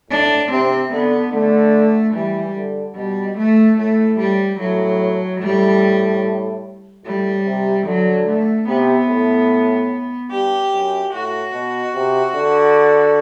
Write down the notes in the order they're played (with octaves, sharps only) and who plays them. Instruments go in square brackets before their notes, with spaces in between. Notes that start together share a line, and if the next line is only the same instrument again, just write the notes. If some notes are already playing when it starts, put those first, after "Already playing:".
[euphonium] A2 [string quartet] D4
[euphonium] C3 [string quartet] C4
[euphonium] D3 [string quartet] B3
[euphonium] D3 [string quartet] A3
[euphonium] E3 [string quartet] G3
[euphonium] D3
[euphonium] B2 [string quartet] G3
[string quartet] A3
[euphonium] A2 [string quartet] A3
[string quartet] G3
[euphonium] A2 [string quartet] F#3
[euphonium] A2 [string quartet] G3
[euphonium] A2 [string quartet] G3
[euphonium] C3
[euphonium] D3 [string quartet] F#3
[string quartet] A3
[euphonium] C3 [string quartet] B3
[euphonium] A2
[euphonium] G2 [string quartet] G4
[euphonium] F#2
[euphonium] A2 [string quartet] F#4
[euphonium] B2
C3
D3